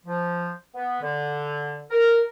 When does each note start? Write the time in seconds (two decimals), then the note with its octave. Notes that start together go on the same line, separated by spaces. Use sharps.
0.05 F3
0.74 B3
1.01 D3
1.90 A#4